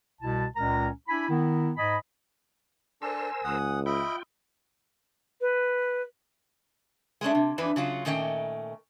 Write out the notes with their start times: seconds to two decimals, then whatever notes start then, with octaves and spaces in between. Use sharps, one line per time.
0.21 C2 B2 E4 A5
0.56 C#2 A#2 G#3 C#4 A#4 A#5
1.08 D4 E4 G#5 B5
1.28 D#3 B3 E4
1.77 G#2 D#5 G#5 B5
3.02 D4 A4 A#4 C5 G#5 E6
3.44 C#2 F#5 D#6
3.86 F4 D#5 E5 G5 B5
5.41 B4
7.21 G#3 A3 C#4 D4
7.35 C3
7.58 F2 E3 D4 B4
7.76 C#3 F#3 F4
8.05 A#2 D#3 A3 C#4 D#5 G5